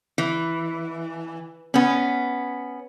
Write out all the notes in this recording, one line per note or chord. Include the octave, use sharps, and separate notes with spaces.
E3
B3 C#4